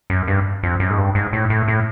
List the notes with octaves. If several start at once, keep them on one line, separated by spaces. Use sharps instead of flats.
F#2
G2
F2
F#2
G#2
G2
G#2
A2
A2
A2